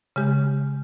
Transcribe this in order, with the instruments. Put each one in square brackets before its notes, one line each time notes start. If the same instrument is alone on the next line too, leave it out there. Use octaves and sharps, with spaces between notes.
[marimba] C#3 G#3 G4